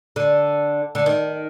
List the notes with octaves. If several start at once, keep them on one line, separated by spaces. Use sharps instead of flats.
D3
D3
D#3